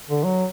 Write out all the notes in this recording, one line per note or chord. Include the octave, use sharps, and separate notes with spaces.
D3
F#3